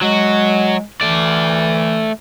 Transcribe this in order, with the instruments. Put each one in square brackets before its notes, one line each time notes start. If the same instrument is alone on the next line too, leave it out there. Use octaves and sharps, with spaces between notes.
[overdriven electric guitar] F#3 F#4 [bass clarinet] G#3
[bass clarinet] E3 [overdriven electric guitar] A3 D5